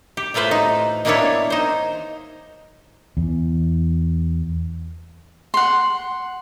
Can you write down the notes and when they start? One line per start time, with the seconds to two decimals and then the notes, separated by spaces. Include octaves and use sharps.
0.17 G4
0.34 A2 A3 F4 B4 C5
0.51 D#4
1.05 D#3 A#3 B3 D4 E4 C#5
1.50 D#4 C5
3.17 E2
5.54 F#5 C6